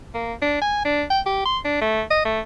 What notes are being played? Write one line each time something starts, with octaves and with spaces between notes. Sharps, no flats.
A#3
D4
G#5
D4
G5
G4
C6
D4
A3
D#5
A3